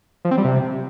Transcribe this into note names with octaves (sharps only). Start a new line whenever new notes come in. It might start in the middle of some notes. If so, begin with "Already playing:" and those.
F3
C4
G3
C3